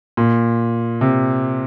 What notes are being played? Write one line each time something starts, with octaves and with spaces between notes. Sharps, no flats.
A#2
C3